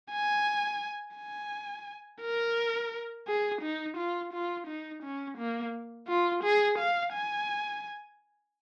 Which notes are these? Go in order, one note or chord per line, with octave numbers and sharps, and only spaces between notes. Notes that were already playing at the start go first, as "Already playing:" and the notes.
G#5
G#5
A#4
G#4
D#4
F4
F4
D#4
C#4
A#3
F4
G#4
F5
G#5